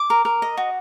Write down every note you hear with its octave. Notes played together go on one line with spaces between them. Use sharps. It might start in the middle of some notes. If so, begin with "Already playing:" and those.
Already playing: D6
A#4
A#4
D#5
F#4